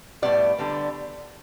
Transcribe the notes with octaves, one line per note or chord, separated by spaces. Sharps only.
A2 G3 B3 D5
D3 G3 B3